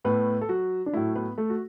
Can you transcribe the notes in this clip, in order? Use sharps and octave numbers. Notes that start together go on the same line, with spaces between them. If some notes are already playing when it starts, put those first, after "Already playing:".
A2 A3 B3 B4
A4
F#3 F#4
D4
A2 F#3 A3 E4
B3 B4
A3 A4
F#4